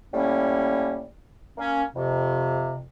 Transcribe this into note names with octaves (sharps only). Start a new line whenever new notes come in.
A2 G3 A#3 C#4
A#3 C#4
F2 C3